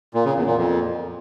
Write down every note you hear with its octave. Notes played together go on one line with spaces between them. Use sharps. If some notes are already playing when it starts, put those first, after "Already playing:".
A#2
C#3
E2
A#2
F2